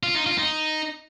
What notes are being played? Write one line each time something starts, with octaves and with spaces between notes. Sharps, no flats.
F4
D#4
F4
D#4